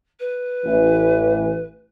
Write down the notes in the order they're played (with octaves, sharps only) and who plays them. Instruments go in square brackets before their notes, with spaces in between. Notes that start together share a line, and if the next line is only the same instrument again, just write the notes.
[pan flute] B4
[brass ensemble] A1 E3